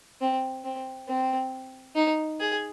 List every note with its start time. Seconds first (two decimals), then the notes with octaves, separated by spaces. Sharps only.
0.21 C4
0.64 C4
1.08 C4
1.96 D#4
2.40 G#4